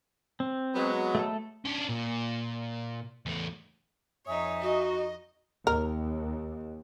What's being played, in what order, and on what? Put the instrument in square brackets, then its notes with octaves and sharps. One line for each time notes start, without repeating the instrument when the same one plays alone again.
[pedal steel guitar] C4
[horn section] F#3 G#3 B3
[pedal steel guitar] A3 A4
[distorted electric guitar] C#4 D4
A#2
E2 A3
[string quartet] F2 D#4 [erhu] C#5 [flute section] E5 G#5 D#6
[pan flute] F#4 [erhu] D#5
[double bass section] D#2 [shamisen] A#4